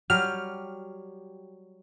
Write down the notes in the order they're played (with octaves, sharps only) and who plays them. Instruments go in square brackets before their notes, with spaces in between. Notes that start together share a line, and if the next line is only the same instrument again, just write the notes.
[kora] F#3 G3 G4 [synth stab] F6